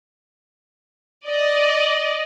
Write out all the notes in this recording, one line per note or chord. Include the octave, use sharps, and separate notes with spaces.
D5 D#5